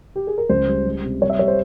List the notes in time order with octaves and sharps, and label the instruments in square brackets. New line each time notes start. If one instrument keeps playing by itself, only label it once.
[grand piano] G4
G#4
A#4
C#2 C5
G3
G3
C3
G3 C#5
E5
G3 C#5
C5